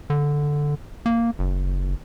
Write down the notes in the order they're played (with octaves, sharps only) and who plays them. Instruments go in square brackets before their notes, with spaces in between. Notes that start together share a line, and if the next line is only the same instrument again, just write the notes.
[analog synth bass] D3
A#3
F#1